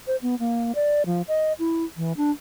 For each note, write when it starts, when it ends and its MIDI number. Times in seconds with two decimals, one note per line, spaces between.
0.07 0.16 72
0.22 0.39 59
0.39 0.72 58
0.75 1.03 74
1.06 1.22 53
1.28 1.53 75
1.59 1.84 64
1.97 2.13 52
2.17 2.31 62